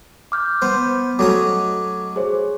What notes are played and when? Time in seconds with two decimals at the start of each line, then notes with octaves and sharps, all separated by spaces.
0.32 D6 F6 G6
0.62 B3 C5
1.19 F#3 A3 C#4 A4 D6 D#6
2.16 G#4 C5 C#5